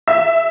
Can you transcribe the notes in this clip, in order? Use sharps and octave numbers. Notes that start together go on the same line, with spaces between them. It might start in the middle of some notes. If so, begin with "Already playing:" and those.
E5